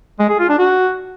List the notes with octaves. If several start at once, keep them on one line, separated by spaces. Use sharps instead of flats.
G#3
G#4
F4
D4
F#4